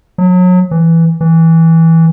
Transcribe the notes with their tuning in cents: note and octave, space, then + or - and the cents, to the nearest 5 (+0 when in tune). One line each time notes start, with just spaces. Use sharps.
F#3 -30
E3 +5
E3 -10